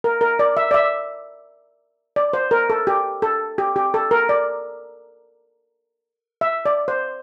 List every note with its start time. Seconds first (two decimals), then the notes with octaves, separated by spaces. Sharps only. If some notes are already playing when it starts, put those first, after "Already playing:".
0.04 A#4
0.21 A#4
0.39 D5
0.57 E5
0.71 D5
0.74 E5
2.16 D5
2.33 C5
2.51 A#4
2.70 A4
2.87 G4
3.22 A4
3.58 G4
3.76 G4
3.94 A4
4.11 A#4
4.29 D5
6.41 E5
6.66 D5
6.88 C5